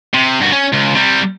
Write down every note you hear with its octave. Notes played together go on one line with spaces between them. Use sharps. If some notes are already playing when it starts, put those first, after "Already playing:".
C3
G2 F#4
C#4
C#2
C3 G3